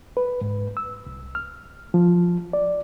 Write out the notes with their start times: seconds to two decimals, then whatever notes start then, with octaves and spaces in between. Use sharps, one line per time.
0.17 B4
0.41 G#2
0.77 E6
1.07 C2
1.35 F6
1.94 F3
2.53 D5